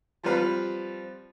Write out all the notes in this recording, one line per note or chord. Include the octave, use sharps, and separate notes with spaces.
F3 G3 C4 B4 F5